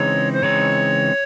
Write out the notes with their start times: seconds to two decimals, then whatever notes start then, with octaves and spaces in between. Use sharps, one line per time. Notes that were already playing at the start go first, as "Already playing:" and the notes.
Already playing: C#3 E3 G#3 C4 D#4 C#5
0.33 C5
0.42 C#3 E3 G#3 C4 D#4 C#5